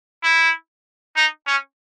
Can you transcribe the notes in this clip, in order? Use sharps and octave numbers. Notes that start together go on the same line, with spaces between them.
E4
D#4
C#4